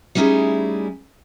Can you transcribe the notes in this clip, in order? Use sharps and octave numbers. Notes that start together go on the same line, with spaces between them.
G3 A3 C#4 D#4 E4 G#4